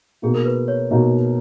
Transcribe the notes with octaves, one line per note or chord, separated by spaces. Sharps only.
B2 A#3 D#4 F#4 G#4
A#4
B4
C#5
B2 A#3 D#4 F#4